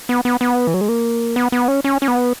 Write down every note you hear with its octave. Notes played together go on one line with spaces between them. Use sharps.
B3
B3
B3
E3
F#3
G#3
A#3
B3
B3
C#4
C#4
C#4
B3